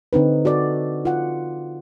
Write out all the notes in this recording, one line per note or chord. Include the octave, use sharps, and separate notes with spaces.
D3 C4 D#4 B4
F#4 A4 D5
F4 F#5